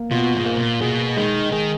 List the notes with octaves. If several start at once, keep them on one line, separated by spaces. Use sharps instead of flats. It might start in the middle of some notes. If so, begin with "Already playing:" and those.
Already playing: A#3
B2 F4
G#2
A#3
A#2
B2 G#4
D#3 G#3
D#3 G#4